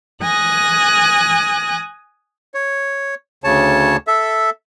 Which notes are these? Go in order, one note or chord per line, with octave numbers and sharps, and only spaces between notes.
G#5 D#6 F#6 A#6
C#5
D2 C#3 C#5 A5
A4 E5